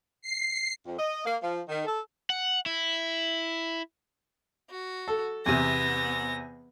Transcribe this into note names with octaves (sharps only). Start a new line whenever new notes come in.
C7
F2
D#5
A#3
F3
D#3
A4
F#5
E4
F#4
A4
E2 C3 B3 A#6